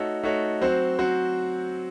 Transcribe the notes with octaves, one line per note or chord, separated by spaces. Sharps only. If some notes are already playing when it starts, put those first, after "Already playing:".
Already playing: A3 D#4 F#4 A4 C#5
A3 D#4 F#4 A4 C#5
F#3 C4 F#4 C5
F#3 C4 F#4 C5